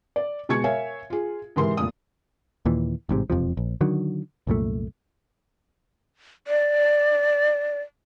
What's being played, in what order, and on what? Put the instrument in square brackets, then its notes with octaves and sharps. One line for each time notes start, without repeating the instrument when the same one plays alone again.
[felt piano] D5
B2 G#3 C#6 G#6 C#7
A#4 C#5 E5 F5 G#5
F4 G#4
G#2 C3 E3 A#4 C6
F1 A#2 D#6
[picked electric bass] D#2 A#2 E3
A1 G#2 C3
E1 F2 C3 F3
A#1
D3 D#3 F#3
C2 F#2 A#2 A3
[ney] D5